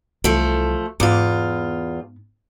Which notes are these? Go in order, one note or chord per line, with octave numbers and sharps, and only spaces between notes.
C2 E3 F3 A3
E2 G#2 B3 F4